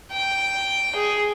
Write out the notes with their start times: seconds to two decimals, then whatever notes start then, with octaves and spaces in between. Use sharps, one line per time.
0.12 G5
0.95 G#4